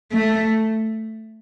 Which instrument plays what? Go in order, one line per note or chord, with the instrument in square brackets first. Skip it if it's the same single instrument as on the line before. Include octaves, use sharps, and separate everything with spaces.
[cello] A3